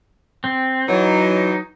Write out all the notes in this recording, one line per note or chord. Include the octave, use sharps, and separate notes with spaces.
C4
E3 F#3 D#4